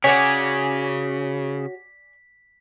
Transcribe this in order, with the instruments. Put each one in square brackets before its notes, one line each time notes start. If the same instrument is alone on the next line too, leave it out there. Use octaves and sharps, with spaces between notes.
[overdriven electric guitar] C#3 [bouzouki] F#4 C#5 [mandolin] D5 G#5 [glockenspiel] B6